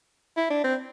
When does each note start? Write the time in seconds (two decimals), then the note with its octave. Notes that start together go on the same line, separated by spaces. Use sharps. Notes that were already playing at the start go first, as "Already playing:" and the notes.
0.37 E4
0.50 D4
0.64 C4